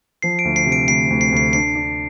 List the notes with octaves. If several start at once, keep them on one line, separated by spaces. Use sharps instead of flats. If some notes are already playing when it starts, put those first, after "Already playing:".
F3 C7
D7
D2
C7
C3
D7
D2 C7
D2
C7
D2 C7
D4 C7
D4